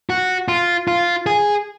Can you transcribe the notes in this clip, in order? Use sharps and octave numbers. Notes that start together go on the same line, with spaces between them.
F#4
F4
F4
G#4